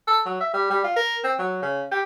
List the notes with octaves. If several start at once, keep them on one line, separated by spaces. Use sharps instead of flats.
A4
F#3
E5
G3
G3
F4
A#4
C4
F#3
C#3
G4